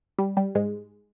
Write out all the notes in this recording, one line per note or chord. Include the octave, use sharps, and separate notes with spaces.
G3
G3
G#2 G#3